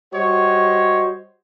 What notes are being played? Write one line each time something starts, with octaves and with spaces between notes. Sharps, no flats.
G3 F#4 C5 C#5 D#5